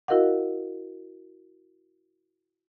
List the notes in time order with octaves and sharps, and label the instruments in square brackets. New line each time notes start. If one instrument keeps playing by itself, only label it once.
[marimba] E4 F#4 A#4 D#5 F5 F#5